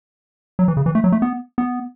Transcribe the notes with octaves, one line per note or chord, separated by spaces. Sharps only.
F#3
E3
C#3
E3
A3
F#3
A3
B3
B3